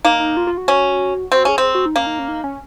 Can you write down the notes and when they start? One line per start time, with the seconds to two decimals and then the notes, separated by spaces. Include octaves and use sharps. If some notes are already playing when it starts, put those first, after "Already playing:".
0.05 A#3 D#4
0.20 D#4
0.37 F4
0.47 F4
0.57 F#4
0.68 C#4
1.32 C4 F#4
1.45 C#4 G#4
1.58 C4
1.75 F#4
1.86 D#4
1.96 A#3 C#4
2.07 D#4
2.19 C#4
2.28 D#4
2.44 C#4